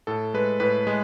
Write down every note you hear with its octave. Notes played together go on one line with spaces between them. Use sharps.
A2 A4
G#3 B4
A2 B4
G#3